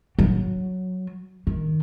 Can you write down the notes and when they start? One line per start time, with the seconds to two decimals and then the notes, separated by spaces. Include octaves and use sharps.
0.19 F#3
1.47 D#3